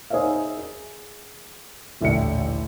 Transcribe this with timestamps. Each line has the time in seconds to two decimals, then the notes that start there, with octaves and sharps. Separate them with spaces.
0.10 D#4 G#4 C5 C#5 E5 F5
0.57 G#4
2.01 D#1 A1 D3 E5 G5 C#7